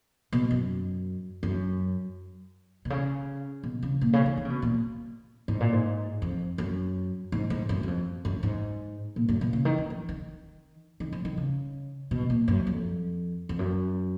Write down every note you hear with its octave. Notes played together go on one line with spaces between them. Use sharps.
B2
F#2
F#2
B2
C#3
B2
C#3
A#2
C#3
D#3
D#3
C#3
B2
A#2
G#2
A#2
G#2
F2
F#2
G#2
G#2
F#2
F#2
F2
F#2
G#2
A#2
F#2
A#2
C#3
D#3
D#3
F3
D#3
D#3
F3
D#3
C#3
B2
A#2
F#2
F2
F2
F#2